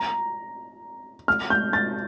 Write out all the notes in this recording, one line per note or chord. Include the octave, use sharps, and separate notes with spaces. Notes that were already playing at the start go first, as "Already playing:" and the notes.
Already playing: A#5
F6
G6
A6